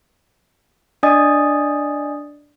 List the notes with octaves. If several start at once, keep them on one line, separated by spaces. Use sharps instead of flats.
D4 D5 D#5 G#5 D#6 A6